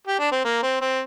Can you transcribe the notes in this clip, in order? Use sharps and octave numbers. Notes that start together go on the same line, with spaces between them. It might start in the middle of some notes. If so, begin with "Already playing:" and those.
G4
D4
C4
A#3
C4
C4